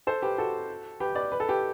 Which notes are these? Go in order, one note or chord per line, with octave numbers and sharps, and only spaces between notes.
A4 C5
G4 B4
F#4 A4
G4 B4
B4 D5
B4
A4
G4 B4